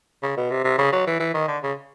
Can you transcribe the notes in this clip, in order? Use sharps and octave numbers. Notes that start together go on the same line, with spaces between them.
C#3
B2
C3
C3
C#3
F#3
E3
E3
D#3
D3
C#3